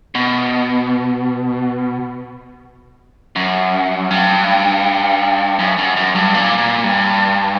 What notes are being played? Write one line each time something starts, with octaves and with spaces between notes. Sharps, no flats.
B2
F#2
G2
F#2
F#2
F#2
G2
A#2
A#2
G2